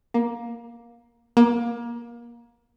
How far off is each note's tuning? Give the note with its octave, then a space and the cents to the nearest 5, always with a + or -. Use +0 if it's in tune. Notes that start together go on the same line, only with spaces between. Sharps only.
A#3 +15
A#3 +25